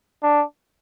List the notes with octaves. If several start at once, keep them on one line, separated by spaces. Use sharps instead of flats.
D4